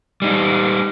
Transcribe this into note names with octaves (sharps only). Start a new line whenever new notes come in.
G3 D#4